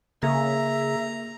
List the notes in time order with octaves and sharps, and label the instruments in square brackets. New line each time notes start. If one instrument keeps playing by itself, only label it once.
[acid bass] C#3 [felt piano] A#3 G#4 [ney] E5 [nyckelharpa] A#5